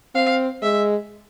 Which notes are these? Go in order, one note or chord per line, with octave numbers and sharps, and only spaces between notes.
C4 F5
G#3 E5